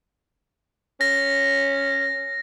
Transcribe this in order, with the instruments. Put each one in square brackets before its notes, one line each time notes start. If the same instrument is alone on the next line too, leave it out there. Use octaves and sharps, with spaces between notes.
[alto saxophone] C#4 [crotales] A#6